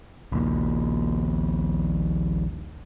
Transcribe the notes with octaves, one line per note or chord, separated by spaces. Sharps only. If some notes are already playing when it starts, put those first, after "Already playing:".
A#1 D#2